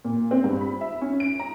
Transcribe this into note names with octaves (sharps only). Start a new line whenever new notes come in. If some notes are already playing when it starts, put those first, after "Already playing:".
A#2
C4
G2
B5
E5
C#4
D7
A#5